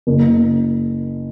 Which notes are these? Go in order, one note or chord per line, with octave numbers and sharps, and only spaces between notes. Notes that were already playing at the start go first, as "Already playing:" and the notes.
F#1